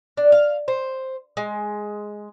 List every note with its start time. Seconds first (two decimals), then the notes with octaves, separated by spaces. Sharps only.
0.17 D4
0.32 F5
0.68 C5
1.37 G#3